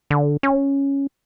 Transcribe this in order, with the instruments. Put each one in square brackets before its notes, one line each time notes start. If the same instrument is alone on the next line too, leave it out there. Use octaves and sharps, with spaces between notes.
[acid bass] D3
C#4